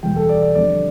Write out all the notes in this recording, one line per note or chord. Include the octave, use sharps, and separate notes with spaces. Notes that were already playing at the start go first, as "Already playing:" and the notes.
E2 B2 G3 G5
A4
D5
D5
F2 D3 G3 D5